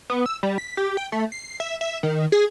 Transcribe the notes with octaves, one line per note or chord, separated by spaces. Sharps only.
B3
E6
G3
B6
G4
G5
A3
C7
E5
E5
D#3
G#4